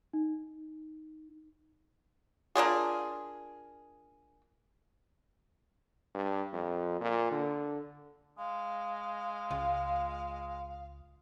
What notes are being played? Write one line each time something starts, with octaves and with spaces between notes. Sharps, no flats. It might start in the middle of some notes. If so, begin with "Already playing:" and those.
D#4
A#3 D4 F4 G#4
G2
F2
A#2
D3
G#3 F5
C#2 F4